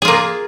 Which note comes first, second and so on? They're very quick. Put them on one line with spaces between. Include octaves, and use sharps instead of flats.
G#4 F4 A#3